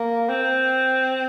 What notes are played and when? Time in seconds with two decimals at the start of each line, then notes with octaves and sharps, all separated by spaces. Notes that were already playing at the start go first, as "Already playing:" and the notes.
Already playing: A#3
0.29 C4